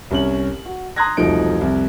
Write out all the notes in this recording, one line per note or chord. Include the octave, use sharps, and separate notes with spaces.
C2 C#4 F#7
F#4
A#5 C6 D#6 F#6 G#6 A#6
E1 C2 F3 A3 D#4 D7
C2 F2